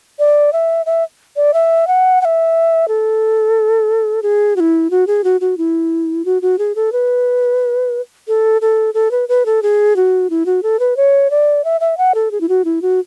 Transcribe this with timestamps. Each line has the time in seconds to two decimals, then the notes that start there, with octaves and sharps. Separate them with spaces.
0.19 D5
0.53 E5
0.86 E5
1.36 D5
1.53 E5
1.87 F#5
2.21 F#5
2.25 E5
2.88 A4
4.22 G#4
4.56 F#4
4.60 E4
4.90 F#4
5.07 G#4
5.24 F#4
5.41 F#4
5.58 E4
6.25 F#4
6.42 F#4
6.58 G#4
6.75 A4
6.92 B4
8.28 A4
8.61 A4
8.94 A4
9.11 B4
9.29 B4
9.46 A4
9.62 G#4
9.96 F#4
10.30 E4
10.46 F#4
10.63 A4
10.79 B4
10.97 C#5
11.30 D5
11.64 E5
11.80 E5
11.98 F#5
12.15 A4
12.31 G#4
12.41 E4
12.49 F#4
12.65 E4
12.82 F#4